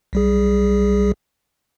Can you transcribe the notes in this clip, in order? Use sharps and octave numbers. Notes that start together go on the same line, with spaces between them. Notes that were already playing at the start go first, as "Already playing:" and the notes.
B1 G3 G#4